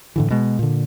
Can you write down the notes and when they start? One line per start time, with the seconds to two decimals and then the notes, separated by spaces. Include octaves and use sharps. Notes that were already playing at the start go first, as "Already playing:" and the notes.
0.16 A2 D3 E3
0.30 B2 G#3
0.59 A#2 D3